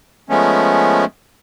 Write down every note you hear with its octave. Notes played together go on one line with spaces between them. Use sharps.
F3 G#3 A3 B3 C#4